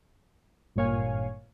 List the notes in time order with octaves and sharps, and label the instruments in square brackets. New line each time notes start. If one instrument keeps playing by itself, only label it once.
[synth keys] G#1 G2 A#2 C#5 F5 G#5